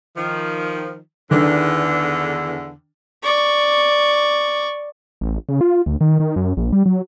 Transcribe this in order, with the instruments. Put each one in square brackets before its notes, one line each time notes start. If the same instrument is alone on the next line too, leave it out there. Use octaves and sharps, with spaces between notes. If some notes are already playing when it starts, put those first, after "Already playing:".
[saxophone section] D#3 F3
[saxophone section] E2 D3 [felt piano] D#3 D4
[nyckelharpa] D5 C#6
[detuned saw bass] A1
C#3
F4
D2
D#3
D#3
F#2
A#1
G3
F#3